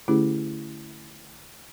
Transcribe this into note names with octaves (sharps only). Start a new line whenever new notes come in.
D3 A3 C#4 E4 G4 G#4